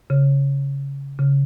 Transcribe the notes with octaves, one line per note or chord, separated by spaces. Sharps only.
C#3
C#3